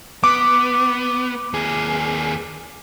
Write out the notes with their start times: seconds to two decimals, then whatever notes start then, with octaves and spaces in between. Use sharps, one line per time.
0.24 B3 D6
1.53 D#2 G#4